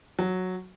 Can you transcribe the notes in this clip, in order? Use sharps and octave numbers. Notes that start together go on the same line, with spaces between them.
F#3